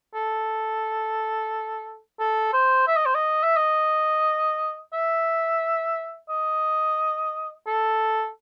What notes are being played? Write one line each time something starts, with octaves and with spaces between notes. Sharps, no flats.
A4
A4
C5
E5
D#5
C5
D#5
E5
D#5
E5
D#5
A4